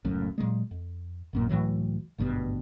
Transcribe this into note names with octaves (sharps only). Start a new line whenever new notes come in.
D1 C#2 F#2 A2
A#2 C#3 F#3 G#3
F2
A1 F#2 A#2
C#2 A2 E3 F#3
G#1 D2 G2 B2